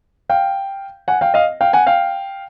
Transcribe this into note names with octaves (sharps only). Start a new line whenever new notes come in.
F5 G5
F#5 G#5
F5 G5
D#5 F5
F5 G5
F#5 G#5
F5 G5